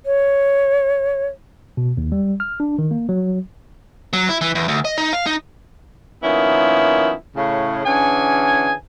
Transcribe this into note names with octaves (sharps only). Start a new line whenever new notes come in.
C#5
B2
D#2
G3
F6
D4
D#3
A#3
F#3
F#3
E4
E3
E2
D2
D#5
D#4
F5
D#4
D#3 F3 A#3 B3 C#4 E4
A2 C#3
D3 E3 C#4 G#4 G#5